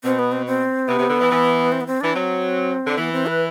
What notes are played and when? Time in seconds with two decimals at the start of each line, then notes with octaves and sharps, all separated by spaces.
0.04 B2 C4
0.19 B3
0.32 C4
0.46 C4
0.88 C3 B3
0.99 C3
1.09 D3
1.20 E3
1.30 E3
1.72 C4
1.81 B3
1.87 C4
2.01 E3 D4
2.14 F#3 C4
2.87 D3
2.97 E3 B3
3.12 C4
3.26 B4